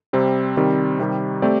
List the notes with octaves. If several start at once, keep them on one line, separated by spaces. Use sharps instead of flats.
C3 G3 C4
C3 D#3 G3 C4
C3 D#3 G3
A3 C4 G4 D5